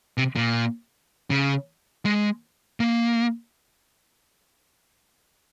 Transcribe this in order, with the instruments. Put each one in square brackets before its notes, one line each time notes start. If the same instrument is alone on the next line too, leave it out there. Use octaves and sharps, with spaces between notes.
[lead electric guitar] C3
A#2
C#3
G#3
A#3